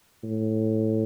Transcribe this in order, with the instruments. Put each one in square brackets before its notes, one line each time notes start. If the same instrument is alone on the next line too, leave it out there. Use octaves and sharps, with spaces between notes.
[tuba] A2